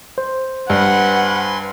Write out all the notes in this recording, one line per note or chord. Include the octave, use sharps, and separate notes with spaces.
C5
G2 B4 F#5 G#5 C6